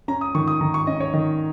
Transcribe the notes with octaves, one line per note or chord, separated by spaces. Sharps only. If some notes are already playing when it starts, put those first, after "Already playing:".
C#4 A#5
D#6
D#3 C#6
D#6
D#3 A#5
C#6
C#4 D#5
C#5
D#3 D#5